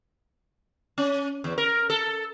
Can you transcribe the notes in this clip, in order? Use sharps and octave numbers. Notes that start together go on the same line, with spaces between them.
C#4
E2
A#4
A4